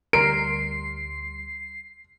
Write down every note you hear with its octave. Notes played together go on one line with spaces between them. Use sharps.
D2 G3 A#4 C6 C7 D7